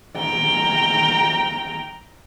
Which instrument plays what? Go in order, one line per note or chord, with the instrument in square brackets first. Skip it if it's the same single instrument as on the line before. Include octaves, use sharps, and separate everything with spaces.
[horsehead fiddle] G5 A#5